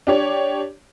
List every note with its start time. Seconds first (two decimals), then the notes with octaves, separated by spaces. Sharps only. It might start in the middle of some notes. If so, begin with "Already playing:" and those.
0.07 D4 G4 C#5